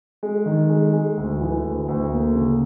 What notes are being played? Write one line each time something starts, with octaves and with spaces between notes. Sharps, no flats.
G#3
D#3
G#3
G#3
D2
E3
D2
D2
A#3
C#3